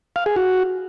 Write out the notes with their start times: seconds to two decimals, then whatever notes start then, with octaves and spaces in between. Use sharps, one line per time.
0.16 F5
0.26 G#4
0.36 F#4